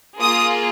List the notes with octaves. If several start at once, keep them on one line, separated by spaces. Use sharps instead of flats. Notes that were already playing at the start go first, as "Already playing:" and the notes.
A#3 F4 G#4 D#6